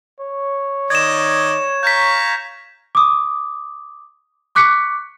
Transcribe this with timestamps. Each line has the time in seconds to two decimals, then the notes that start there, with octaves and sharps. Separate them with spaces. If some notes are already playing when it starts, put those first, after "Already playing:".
0.20 C#5
0.90 D#3 D5 D#5 G#6 E7
1.83 F5 A#5 C#6 G6 B6
2.95 D6 D#6
4.55 C#6 D6 F#6 B6 C#7